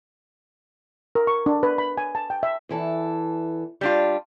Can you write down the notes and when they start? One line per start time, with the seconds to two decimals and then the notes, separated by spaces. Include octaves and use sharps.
1.15 A#4
1.27 C#6
1.46 D4
1.63 B4
1.78 B5
1.98 G#5
2.15 A5
2.30 G5
2.43 E5
2.69 E2 E3 A4
3.81 G3 D4 F4